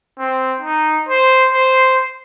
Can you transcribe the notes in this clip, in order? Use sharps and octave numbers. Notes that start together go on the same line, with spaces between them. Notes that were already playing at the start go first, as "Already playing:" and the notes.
C4
D#4
C5
C5